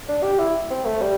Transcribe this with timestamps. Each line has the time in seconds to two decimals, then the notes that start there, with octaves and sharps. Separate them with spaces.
0.08 D4
0.23 G4
0.39 E4
0.70 C4
0.85 A3
1.02 G3